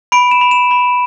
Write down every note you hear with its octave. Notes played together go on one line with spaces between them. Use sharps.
B5 D7
E7
B5
E7
B5